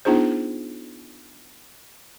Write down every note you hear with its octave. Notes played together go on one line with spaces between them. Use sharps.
B3 D4 D#4 F4 G#4 C5